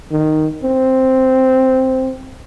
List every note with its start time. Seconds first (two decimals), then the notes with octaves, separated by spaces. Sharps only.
0.12 D#3
0.63 C4